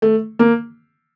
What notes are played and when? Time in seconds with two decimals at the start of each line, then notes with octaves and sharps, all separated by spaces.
0.02 A3
0.39 A#3